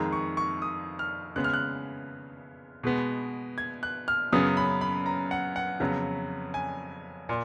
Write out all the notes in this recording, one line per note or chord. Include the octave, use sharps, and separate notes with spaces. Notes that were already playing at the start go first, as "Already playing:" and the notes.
Already playing: F2 D#3 G#3 A#5
C#6
C#6
D#6
F6
C#3 G#3 B3 F#6
F6
F#6
B2 G#3 B3
G#6
F#6
F6
F#2 C#3 F#3 B3 D#6
B5
B5
A#5
F#5
F#5
F2 C#3 F#3 B3
G#5
A#2